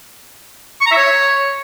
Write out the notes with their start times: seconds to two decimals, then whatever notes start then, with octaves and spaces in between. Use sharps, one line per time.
0.81 C#6
0.86 A#5
0.92 E5
0.97 C#5